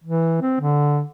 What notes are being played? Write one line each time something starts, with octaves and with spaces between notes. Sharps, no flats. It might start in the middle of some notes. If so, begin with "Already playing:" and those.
E3
C4
D3